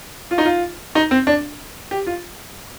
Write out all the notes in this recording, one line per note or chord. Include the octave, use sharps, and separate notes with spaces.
F4
D#4
F4
D#4
C4
D4
G4
F4